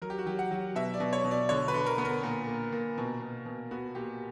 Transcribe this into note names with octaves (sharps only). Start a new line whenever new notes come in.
F#3 A#4
G4
F#4
F#3 G4
F#5
F#3
B2 E5
D5
B2
C#5
B2
D5
D3 C#5
B4
D3
A#4
B3
A#4
A#2
A#3
A#2
B2
B2
B2
B3 F#4
A#2 G4